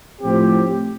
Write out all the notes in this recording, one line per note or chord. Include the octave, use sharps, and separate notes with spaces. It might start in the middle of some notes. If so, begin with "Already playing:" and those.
A2 F3 C4 G4